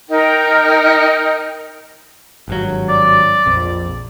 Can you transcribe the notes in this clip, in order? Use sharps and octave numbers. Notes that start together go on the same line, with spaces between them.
D#4 A#4 G5
G#1 G2 F#3
D5
A#1 F2